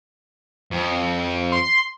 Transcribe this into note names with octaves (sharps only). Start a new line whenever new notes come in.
F2
C6